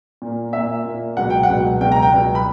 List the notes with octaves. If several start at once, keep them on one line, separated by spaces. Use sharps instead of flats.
A#2 A#3
A#2 A#3 E5
A#2 A#3
C#2 B2 F#3 F#5
G5
F#5
C#2 B2 F#3
C#2 B2 F#3 G5
A#5
G5
C#2 B2 F#3
B5